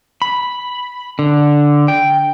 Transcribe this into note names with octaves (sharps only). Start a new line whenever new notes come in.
B5
D3
G5